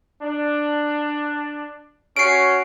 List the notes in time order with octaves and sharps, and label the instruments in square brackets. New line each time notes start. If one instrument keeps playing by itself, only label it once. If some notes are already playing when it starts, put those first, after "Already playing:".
[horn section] D4
[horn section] C#4 F#4 [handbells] C7 D7